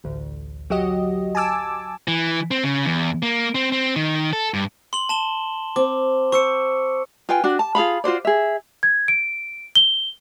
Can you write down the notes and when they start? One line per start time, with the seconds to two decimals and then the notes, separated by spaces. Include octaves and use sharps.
0.04 A1 D2
0.70 F#3 F#4 G4 D#5
1.35 G#5 A5 D6 E6
2.08 E3
2.51 C4
2.64 C#3
2.86 E2
3.23 A#3
3.55 C4
3.72 C4
3.96 D#3
4.33 A4
4.54 G2
4.93 C6 F#7
5.09 A5 E7 G7
5.76 C4 D6
6.32 C5 C#6 E6 C#7
7.29 F4 B4 G5 G#5
7.44 D4 F#4
7.59 A5
7.75 F4 G#4 F5 B5
8.04 F4 F#4 C5 D5
8.25 G#4 E5
8.83 G#6
9.08 D7
9.75 G7